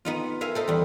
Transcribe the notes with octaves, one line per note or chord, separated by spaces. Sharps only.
B3 D#4 F4
A#4 E5 F5 G#5
A4 C5 D#5
E2 G3